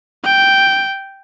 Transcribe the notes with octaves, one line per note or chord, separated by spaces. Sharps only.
G5